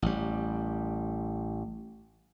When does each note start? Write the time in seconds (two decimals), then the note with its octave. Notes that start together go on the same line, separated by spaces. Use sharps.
0.02 A1 G3